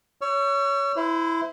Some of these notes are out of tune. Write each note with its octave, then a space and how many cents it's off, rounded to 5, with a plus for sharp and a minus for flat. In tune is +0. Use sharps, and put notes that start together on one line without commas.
C#5 +15 E6 +45
E4 +0 C5 -35